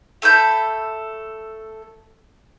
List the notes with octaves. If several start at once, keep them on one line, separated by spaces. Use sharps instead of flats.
A3 A4 B5 G6